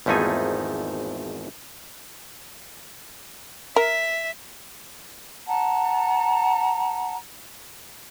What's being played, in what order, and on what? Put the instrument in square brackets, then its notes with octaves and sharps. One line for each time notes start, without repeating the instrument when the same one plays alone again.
[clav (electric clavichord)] G#1 E2 F3 A3 D#4 G#5
[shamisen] A#4 [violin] E5
[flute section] F#5 A5 A#5